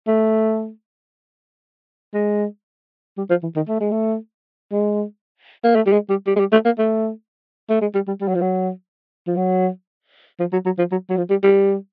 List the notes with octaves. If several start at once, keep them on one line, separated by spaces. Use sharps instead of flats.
A3
G#3
G3
F3
E3
D#3
A3
G#3
A3
G#3
A#3
A3
G3
G#3
G3
G3
G#3
G3
A3
A#3
A3
A3
G#3
G3
G3
G3
F#3
F3
F#3
F3
F#3
F3
F#3
F#3
F3
F#3
F#3
F3
G3
G3